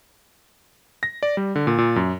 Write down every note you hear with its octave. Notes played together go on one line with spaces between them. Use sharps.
A#6
D5
G3
D3
A#2
A#2
F#2